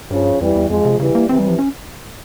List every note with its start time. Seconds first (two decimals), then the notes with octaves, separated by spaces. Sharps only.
0.11 G2 C#3 F3
0.40 F2 E3 G3
0.56 E2
0.70 F2 F3 G#3
0.85 C3
0.99 C#3 E3 G3
1.15 A#3
1.29 C3 E3 C4
1.39 G3
1.48 F3
1.59 C#4